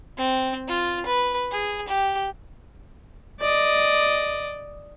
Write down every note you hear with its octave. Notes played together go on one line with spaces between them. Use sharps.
C4
F4
B4
G#4
G4
D5 D#5